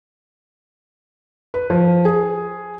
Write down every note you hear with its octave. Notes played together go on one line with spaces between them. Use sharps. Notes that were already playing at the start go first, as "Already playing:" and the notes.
B4
F3
G#4